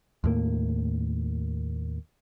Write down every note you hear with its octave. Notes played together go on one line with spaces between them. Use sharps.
D#2 A2 A#3